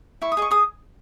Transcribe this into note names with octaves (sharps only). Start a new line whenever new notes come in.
E4 C#6
D#6
G#4 D#5 C#6
G#4 D#6